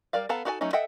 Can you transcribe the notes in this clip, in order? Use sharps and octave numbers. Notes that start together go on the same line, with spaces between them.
G3 A#4 D5 F5
B3 A4 F5 A5 A#5
D#4 F#4 A4 E5 G#5
F#3 A3 C#4 D#4
A4 D#5 E5 F#5 G5